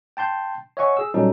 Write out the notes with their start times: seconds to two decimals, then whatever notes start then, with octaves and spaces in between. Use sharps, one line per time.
0.17 G5 A5 C6 G6
0.77 C#5 D#5 E5 F#5 G#5 C#6
0.97 G#4 E6
1.14 A#2 F#3 G3 C#4 D#4 A4